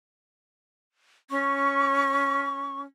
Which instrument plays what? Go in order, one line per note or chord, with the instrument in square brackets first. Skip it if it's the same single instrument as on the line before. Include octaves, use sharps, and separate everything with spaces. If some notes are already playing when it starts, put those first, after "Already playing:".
[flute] C#4 [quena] C#6